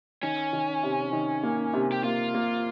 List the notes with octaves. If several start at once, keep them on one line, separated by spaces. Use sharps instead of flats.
D#3 C#4
D#3
C3
D#3
A#3
C3
G4
A#3 F4
A#3